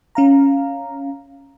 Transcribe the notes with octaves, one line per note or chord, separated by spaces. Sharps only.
C#4 F5 A#5